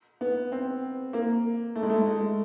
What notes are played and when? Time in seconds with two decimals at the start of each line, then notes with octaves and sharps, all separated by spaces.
0.21 B3
0.52 C4
1.13 A#3
1.75 A3
1.83 G#3
1.90 A3
2.07 G#3